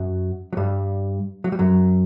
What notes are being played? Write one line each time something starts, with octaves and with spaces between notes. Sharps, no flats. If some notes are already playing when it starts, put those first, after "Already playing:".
Already playing: F#2 F#3
F#3
G2 G3
F#3
G3
F#2 F#3